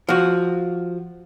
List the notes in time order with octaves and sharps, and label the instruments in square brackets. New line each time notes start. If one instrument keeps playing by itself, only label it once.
[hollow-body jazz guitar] F3 F#4